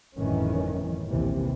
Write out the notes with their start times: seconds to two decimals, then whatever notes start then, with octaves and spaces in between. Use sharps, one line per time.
0.18 G1 F2 A2 D#3 E3 C#4
1.09 A#1 D#2 C3 E3